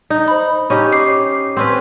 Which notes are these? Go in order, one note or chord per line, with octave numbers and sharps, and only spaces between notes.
D#4
C5 B5
C#4 D#4 G4
D6 C7
C4 C#4 B4